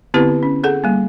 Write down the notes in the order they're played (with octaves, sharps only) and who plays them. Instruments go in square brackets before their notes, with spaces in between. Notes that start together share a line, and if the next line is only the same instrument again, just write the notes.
[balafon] D3 B3 C4 E4 G4 B4
C#4
G#4 A4 F#5
G3 A#3